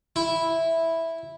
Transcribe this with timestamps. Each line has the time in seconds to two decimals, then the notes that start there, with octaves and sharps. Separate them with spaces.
0.16 E4